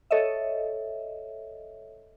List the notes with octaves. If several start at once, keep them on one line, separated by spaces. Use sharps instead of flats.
A4 C#5 D#5 E5